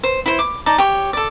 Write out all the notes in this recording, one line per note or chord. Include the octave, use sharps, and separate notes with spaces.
C5
E4 C5
D6
D#4 D5 A5
G4 C#5
A4 D5